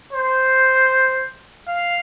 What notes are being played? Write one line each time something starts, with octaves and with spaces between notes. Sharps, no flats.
C5
F5